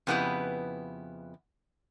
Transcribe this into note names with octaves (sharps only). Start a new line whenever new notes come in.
F2 C#3 B3 E4 G4 B4